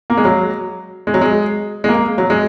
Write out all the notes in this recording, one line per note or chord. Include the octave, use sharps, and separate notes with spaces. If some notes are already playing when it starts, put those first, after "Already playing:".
A#3
G#3
F#3
G#3
F#3
G#3
G#3
A#3
F#3
G#3